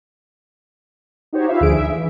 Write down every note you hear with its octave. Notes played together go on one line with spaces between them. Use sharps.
D#4 F#4 G4 C5 C#5
F4 B4 E5 F5
D2 D3 F3 G#4 D7
E5
E3